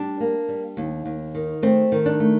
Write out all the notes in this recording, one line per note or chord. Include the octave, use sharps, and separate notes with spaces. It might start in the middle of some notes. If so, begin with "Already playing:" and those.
Already playing: G3 D4
A#3
G3
D#2
D#2
D#3
A3 C4
D#3
D4
A3